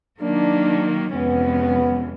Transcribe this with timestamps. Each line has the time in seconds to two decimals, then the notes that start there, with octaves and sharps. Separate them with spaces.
0.21 D#3 F#3 A#3 D4
1.13 F2 C3 E3 G#3 B3 C#4